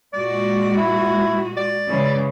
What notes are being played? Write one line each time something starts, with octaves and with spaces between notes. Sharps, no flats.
A#2 G#3 F#4 D5
E4
D5
C#3 E3 G#3